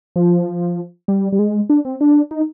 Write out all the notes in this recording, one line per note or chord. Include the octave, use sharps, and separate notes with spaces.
F3
G3
G3
G#3
D4
C4
D4
D#4